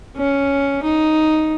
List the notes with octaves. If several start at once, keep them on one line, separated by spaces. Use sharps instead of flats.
C#4
D#4